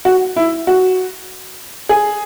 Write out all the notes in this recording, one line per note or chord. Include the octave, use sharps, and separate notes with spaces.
F#4
E4
F#4
G#4